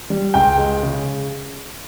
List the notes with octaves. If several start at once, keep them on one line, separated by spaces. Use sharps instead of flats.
G3
C#2 G5
G#3
C#3